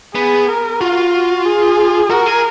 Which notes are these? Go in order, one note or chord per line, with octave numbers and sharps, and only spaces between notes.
B3 G#4
A#4
F4 F#4
F#4
G#4
F#4 A#4
G#4